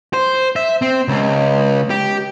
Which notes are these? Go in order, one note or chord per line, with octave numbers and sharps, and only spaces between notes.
C5
E5
C4
C#2
G4